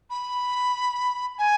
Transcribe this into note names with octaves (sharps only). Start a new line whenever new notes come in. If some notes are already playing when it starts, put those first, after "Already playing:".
B5
G#5